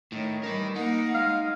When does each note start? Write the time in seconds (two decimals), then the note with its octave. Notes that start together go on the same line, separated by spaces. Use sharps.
0.12 A2 D#3 C#4
0.43 E3 G3 A#4 D#5
0.76 A#3 D#4 F#5
1.14 G#3 F5